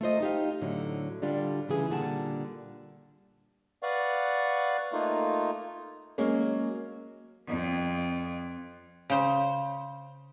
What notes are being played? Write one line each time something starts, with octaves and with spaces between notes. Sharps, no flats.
A3 F4 C5 D#5
D#4 G4 F5
A2 D3 F#3
D3 G3 D4 F4
D2 C#3 E3 G#4
A#2 D3 G3 F#5 A5
B4 D5 F5 F#5 C#6
A3 A#3 D#4 F4
F#3 G#3 A#3 C#4
F2
C#3 C5